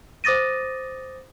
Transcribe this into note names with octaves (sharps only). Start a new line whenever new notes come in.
C5 D6 D#6 A6 A#6 D#7